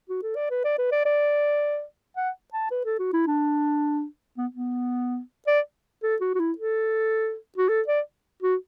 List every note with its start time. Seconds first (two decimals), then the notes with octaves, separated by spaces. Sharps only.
0.09 F#4
0.23 A4
0.36 D5
0.50 B4
0.64 D5
0.78 B4
0.92 D5
1.06 D5
2.17 F#5
2.53 A5
2.71 B4
2.85 A4
2.99 F#4
3.13 E4
3.27 D4
4.37 B3
4.55 B3
5.47 D5
6.03 A4
6.21 F#4
6.35 F#4
6.39 E4
6.58 A4
7.58 F#4
7.69 A4
7.88 D5
8.42 F#4